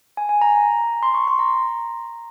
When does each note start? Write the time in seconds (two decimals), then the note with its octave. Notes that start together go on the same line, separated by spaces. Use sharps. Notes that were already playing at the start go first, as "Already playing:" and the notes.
0.17 G#5
0.29 G#5
0.41 A#5
1.03 C6
1.14 C#6
1.27 C6
1.39 A#5